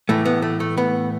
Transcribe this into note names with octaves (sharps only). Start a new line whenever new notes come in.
A2 E3 A3
B3
A3
A3
B3